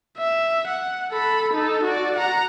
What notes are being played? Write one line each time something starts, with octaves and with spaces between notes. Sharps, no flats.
E5
F#5
A4 B5
D#4 A4
F#4 D5
F#5 A#5